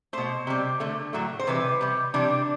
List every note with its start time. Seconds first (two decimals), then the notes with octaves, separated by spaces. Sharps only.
0.13 B2 A3 C5
0.47 C3 G3
0.80 D3 A3
1.13 A2 F#3 A3
1.39 C5
1.47 C3 E3 G3 B4
1.81 C3 G3
2.14 C3 E3 G3 D4